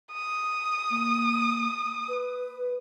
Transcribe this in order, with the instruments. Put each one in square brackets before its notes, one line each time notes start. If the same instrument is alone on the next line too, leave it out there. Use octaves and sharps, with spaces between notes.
[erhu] D#6
[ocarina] A#3
B4